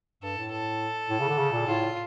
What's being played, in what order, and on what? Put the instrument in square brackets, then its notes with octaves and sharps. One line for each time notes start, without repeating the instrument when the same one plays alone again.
[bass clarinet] G2 [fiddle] A4
[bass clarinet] A2
[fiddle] A4
[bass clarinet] A2
C#3
D3
C#3
A#2
[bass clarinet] A2 [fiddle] F4